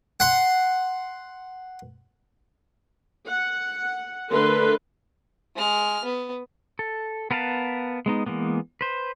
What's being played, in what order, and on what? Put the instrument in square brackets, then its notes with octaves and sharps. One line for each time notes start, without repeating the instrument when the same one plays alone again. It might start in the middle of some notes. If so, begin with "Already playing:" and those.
[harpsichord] F#5 C6
[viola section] F#5
D3 A3 A#4 B4 C6
[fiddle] G#3 F6
B3
[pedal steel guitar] A4
B3 A#4 B4 F5 A5
G#3 B3 D#4
E3 G#3 A#3 B3
B4 C5